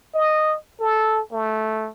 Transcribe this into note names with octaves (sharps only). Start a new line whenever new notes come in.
D#5
A4
A3